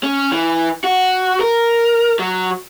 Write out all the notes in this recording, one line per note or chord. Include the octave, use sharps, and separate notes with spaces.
C#4
E3
F#4
A#4
F#3